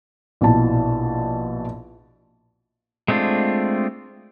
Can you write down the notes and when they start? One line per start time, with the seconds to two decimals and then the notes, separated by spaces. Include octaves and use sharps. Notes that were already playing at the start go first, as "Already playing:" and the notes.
0.41 A#1 B2 E4 A5
3.08 G#3 A3 C4 D4 F4